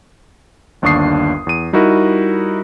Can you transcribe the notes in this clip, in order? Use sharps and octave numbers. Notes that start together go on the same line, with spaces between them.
G1 D#2 D4 C#6 D#6 C7
E2 D#7
G3 D#4 E4 F#4 A#4